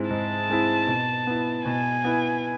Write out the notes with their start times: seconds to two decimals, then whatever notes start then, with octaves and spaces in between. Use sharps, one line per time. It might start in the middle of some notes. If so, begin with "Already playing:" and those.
Already playing: G#2 G#3 C4 E4
0.10 G#2 A5
0.49 G#3 C4 E4
0.87 B2
1.27 B3 E4
1.65 B2 G#5
2.04 B3 E4